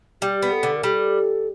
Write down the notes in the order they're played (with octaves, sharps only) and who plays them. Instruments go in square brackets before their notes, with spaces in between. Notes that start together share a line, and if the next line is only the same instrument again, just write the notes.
[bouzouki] G3 [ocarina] G4
[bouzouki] B3
[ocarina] A4
[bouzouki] D3
[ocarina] A#4
[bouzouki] G3 [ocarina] A4